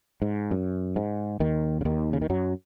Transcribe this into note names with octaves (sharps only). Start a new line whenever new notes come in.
G#2
F#2
G#2
D#2 D#3
C#3
D#2 D#3
C#3
D#3
F#2 F#3